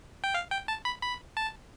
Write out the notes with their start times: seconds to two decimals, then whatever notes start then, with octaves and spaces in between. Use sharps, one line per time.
0.24 G5
0.34 F5
0.52 G5
0.68 A5
0.85 B5
1.03 B5
1.37 A5